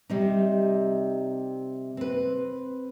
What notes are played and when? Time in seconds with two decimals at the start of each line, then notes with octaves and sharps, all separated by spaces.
0.10 C3 G3 D#4
1.97 C4 B4